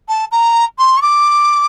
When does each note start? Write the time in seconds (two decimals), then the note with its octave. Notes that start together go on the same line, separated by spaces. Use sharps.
0.08 A5
0.31 A#5
0.78 C6
0.97 C#6
1.02 D6